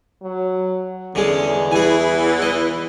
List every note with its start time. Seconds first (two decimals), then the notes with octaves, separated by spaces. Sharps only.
0.23 F#3
1.15 E2 D3 G#3 C#4
1.71 E3 E4 G#4 G#5
2.42 D#5